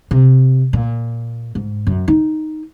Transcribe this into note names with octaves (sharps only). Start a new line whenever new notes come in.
C3
A#2
G#2
F#2
D#4